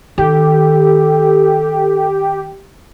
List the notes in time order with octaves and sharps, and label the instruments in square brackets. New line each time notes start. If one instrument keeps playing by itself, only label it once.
[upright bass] D#3 [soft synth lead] G4 [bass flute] A4